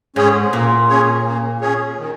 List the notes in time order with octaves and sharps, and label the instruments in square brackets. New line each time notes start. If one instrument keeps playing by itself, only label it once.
[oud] G#2 [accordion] C#4 G#4 C#5
[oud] A#2 [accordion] A#3
[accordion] C#4 G#4 C#5
A#3
C#4 G#4 C#5
D#3